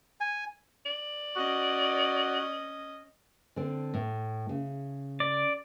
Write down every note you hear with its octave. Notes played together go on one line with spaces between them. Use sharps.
G#5
D5
C#4 F#4 D#5
D3 C4
A2
C#3
D5